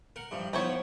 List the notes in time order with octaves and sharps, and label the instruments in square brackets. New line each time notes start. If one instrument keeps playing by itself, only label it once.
[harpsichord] A#4 F#5
G2 E3 F3
[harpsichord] D#3 F3 B3 [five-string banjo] E4 C5 C#5